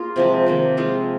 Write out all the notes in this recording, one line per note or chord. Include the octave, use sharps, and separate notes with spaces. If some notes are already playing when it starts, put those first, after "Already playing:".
Already playing: A#3 F4 G#4
C3 F3 G#3
C3 D#3 A#3
F3 G#3 C4 F4